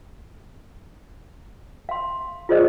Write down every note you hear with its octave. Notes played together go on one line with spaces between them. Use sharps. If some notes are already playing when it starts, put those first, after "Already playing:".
F5 C6
F4 G#4 C5 D5 D#5